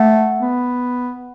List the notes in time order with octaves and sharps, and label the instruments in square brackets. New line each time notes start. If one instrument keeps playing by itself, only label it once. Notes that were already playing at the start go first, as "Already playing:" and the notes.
Already playing: [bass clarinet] A3 [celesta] F#5
[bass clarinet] B3